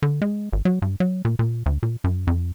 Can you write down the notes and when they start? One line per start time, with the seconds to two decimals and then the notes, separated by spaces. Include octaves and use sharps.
0.02 D3
0.22 G#3
0.52 G#1
0.65 F#3
0.82 G2
1.00 F#3
1.25 A#2
1.39 A#2
1.66 D2
1.83 A#2
2.04 F#2
2.27 F2